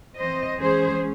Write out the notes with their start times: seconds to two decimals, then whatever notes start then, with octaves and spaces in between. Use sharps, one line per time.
0.17 E3 C4 C5 D#5
0.60 E3 G#3 C#4 G#4 C5